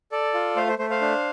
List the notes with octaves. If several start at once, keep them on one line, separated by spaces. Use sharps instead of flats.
A4 D5
F4
A3 C5 F5
C5
A3 C5
C5 F5
D4